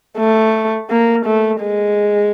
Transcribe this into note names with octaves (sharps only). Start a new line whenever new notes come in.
A3
A#3
A3
G#3